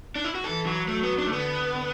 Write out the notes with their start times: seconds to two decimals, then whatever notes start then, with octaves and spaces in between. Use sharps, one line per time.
0.16 D4
0.24 E4
0.35 F#4
0.44 E3 A4
0.66 F#3
0.88 F#3 A3
1.03 B3
1.18 D4
1.27 A3
1.32 D3 B3